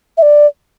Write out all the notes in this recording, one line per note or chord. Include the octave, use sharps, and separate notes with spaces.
E5
D5